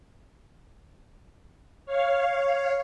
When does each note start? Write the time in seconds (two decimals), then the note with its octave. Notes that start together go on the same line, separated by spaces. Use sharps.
1.86 C#5 F5